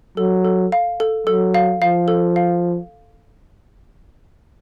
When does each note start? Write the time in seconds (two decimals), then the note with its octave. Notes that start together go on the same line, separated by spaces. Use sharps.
0.17 F#3 A4
0.45 A4
0.72 F5
1.00 A4
1.27 F#3 A4
1.54 F5
1.81 F3 F5
2.08 A4
2.36 F5